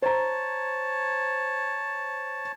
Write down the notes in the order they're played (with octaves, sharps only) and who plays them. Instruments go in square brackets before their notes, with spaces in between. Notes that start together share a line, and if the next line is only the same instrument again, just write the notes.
[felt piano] C5 A#5 [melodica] C#5 A5